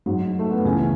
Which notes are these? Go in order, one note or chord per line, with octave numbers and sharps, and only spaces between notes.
G#2 F#3
A3
B3
C#2 C#3 E3 C#4